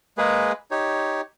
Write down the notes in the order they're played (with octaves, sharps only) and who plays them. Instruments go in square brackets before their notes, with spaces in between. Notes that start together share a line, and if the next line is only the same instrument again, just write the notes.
[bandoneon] G#3 A#3 G#4 B4
D#4 G4 C#5